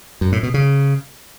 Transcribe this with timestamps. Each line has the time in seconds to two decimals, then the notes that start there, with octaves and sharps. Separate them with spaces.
0.21 F#2
0.32 A2
0.43 B2
0.54 C#3